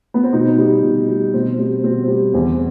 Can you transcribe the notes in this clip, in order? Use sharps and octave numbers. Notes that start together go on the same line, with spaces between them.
B3
C4
B2 D#4
G3
B2
G3
B2 C4
G3 C4
B2 C4
G3
E2 C4